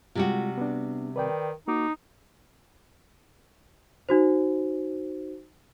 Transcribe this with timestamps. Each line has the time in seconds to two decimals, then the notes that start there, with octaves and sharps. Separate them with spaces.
0.15 C3 G3 G#3 F4 F#4
0.58 B3 D4
1.16 D#3 B4 D5 G5
1.68 A#3 D#4 F#4 D6
4.09 D#4 F#4 C5